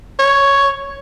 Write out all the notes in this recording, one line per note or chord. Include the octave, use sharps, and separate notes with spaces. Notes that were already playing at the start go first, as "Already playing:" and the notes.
C#5